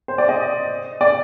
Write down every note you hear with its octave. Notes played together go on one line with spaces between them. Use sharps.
C5
D5
D#5
D5